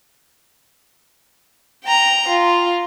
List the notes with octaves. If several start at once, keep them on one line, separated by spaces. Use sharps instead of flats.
G5 A#5
F4